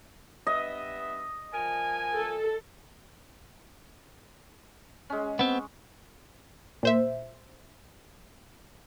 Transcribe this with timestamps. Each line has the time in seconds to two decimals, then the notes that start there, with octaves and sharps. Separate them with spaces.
0.47 G2 B3 D#5 E5
1.53 F3 A#4 G#5
2.18 A4
5.10 G#3 C#4
5.39 B3 C4
6.83 A#2 C5 E5